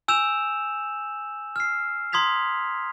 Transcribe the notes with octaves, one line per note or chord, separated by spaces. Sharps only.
G#5 E6 G6 E7 F7
F6 C7
A#5 C6 D#6 G#6 B6 F7